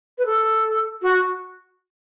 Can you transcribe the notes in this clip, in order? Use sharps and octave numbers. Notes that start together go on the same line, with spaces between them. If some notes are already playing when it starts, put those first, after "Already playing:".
B4
A4
F#4